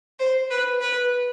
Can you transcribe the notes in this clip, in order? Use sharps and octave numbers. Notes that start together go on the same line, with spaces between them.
C5
B4
B4